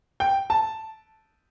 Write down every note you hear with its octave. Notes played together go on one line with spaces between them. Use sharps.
G5
A5